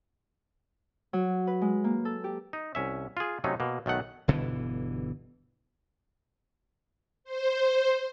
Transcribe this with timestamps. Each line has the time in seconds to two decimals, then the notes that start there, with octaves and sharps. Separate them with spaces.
1.13 F#3
1.47 B4
1.61 G#3
1.84 A#3
2.05 A4
2.24 G4
2.53 D#4
2.75 C2 C#4 E5
3.17 F4 G#4
3.44 C3 F#3 A3 C#4 D#4
3.60 B2 A#3
3.86 B1 D#3 A3 F#5
4.28 G1 B2 D3 E3
7.24 C5